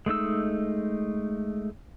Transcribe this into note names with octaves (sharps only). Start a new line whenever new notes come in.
G#3 A3 D#4 E6